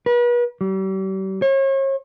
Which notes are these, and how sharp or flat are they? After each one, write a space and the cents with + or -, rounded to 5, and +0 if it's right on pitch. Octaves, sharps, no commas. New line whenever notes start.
B4 -40
G3 -40
C#5 -40